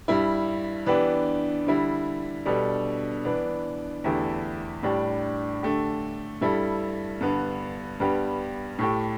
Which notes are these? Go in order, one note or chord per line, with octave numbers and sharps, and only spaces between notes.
G2 G3 E4
E3 B3 D4 G4
D3 G3 E4
B2 G3 D4 A4
E3 B3 D4
E2 D3 A3 E4 G4
A2 G3 D4 G4
D3 A3 G4
G2 G3 E4 A4
G2 D3 B3
G2 G3 B3 G4
A2 A3 G4